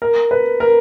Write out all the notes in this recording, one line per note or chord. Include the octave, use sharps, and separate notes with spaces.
A#4
B4
A#4